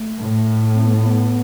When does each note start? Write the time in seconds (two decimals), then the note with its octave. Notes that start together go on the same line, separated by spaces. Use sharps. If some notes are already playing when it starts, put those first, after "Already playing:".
Already playing: A3
0.19 A2
0.75 C4
0.85 B3
0.96 A3
1.05 B3